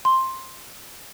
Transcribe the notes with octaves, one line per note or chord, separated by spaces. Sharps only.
C6